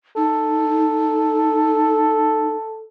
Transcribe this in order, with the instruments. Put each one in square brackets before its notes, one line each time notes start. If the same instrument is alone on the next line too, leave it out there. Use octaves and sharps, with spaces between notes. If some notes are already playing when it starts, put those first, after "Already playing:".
[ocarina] D#4 [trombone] A4